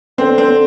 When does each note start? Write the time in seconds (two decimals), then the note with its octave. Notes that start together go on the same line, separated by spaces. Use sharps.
0.18 D3 C4
0.38 C4